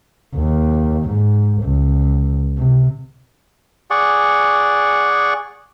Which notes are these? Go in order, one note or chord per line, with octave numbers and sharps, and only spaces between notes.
D#2
G#2
C#2
C3
G#4 D5 F#5 C#6